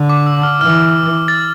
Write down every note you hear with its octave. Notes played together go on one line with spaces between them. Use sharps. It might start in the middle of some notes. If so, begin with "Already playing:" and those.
Already playing: D3
D6
E6
F6
E3 F6
A6